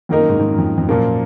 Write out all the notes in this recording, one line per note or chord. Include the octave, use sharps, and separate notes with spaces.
F2 D#3 A#3 D#4 A#4
F#2
G#2
G#2
F#2
F2
F2
F#2 A#2 F3 A#3